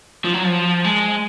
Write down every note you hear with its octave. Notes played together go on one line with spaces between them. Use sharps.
F3
F#3
F3
G#3